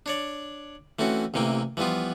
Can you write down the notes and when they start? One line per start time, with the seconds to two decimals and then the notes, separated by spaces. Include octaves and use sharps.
0.06 D4 C#5 D5
0.99 E3 A3 C4 C#4 F#4
1.34 A1 C3 E3 A#3 G5
1.77 E3 F3 G3 B3 F4